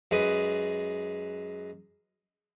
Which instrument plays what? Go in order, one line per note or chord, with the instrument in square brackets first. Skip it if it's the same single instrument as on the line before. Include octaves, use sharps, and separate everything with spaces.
[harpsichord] F#2 G#3 B4 D#6